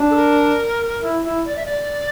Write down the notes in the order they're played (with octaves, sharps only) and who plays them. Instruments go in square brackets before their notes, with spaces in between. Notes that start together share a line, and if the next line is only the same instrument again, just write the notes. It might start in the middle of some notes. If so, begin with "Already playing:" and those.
Already playing: [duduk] D4
[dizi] A4
A#4
[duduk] E4
E4
[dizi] D5
E5
D5